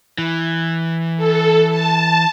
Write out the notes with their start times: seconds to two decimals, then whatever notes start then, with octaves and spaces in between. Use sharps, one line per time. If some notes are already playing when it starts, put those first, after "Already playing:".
0.18 E3
1.17 A4
1.68 A5